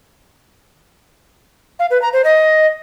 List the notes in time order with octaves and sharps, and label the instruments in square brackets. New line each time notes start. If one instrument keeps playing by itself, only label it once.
[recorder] F5
B4
A#5
C5
D#5